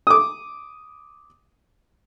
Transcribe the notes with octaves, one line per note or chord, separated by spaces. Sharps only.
D6 D#6